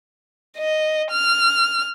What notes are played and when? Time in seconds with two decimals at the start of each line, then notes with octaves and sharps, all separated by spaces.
0.58 D#5
1.12 F6